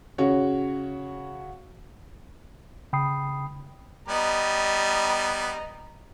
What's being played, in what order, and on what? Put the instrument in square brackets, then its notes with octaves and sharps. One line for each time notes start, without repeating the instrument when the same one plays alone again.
[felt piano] C#3 F#4 C#5
[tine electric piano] C#3 G5 B5 D#6 C7
[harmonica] G3 B3 [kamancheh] D#5 A#5